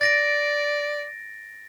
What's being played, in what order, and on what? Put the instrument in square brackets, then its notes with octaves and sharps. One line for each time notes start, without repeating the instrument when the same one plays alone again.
[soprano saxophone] D5 [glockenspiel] A6 A#6 D7